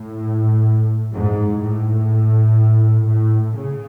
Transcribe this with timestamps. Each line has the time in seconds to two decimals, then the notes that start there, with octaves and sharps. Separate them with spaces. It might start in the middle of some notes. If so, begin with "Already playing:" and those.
Already playing: A2
1.12 G#2
1.61 A2
3.06 A2
3.55 C#3